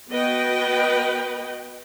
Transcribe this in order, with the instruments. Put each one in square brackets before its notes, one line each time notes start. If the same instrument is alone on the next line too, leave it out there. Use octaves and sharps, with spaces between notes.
[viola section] B3 F#4 B4 D#5 G5